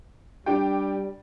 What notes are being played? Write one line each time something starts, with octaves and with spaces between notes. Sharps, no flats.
G3 D4 G4 G5